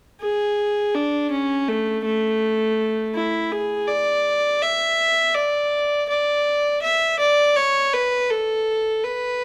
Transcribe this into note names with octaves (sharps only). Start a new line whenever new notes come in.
G#4
D4
C#4
A3
A3
E4
G#4
D5
E5
D5
D5
E5
D5
C#5
B4
A4
B4